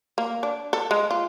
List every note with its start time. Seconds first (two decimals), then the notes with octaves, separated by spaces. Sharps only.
0.18 A#3
0.43 D4
0.73 A4
0.91 G#3
1.11 F4